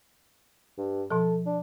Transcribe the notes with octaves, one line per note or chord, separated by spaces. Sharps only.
G2
B2 F3 A4
D4